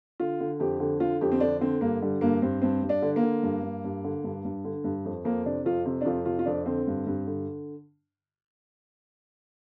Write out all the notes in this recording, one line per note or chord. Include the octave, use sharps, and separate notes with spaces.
D3 F4
D3
F2 G4
D3
D3 F4
F2 G4
C4
D3 D4
D3 C4
G2 A#3
D3 G3
G2 A#3
G2 C4
G2 C4
G2
D4
D3
A#3
D3
G2
G2
G2
D3
G2
G2
D3
G2
F2
F2 A#3
C3 D4
F2 F4
C3
D4
F2 F4
C3 F4
F4
F2 D4
D3 C4
G2
G2
D3